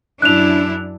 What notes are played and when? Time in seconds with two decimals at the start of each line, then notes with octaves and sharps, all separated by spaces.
0.22 F#2 D4 E4 F#6 F7